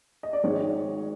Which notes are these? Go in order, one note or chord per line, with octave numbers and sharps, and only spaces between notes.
D#5
D5
G#1 G#2 D#3 G#3 C#5